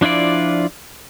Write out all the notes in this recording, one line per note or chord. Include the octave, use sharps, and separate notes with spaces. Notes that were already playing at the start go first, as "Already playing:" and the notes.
F3 D4 E4 F4 D5